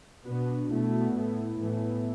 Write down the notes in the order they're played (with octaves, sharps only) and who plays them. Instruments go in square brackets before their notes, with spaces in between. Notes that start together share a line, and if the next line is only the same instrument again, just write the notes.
[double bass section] B2 B3 [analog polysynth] D4 F#4
[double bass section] B2 A3 [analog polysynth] B3 E4
[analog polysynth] B3
B3
[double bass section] A2 A3 [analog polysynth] B3 E4
[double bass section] A2 E3 A3